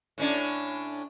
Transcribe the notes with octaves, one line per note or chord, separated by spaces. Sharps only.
A2 C#4 D4